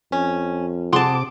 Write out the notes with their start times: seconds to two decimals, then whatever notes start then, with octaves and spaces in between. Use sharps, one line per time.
0.12 F2 C#4
0.93 C3 G#4 F#5 A5 C6 D6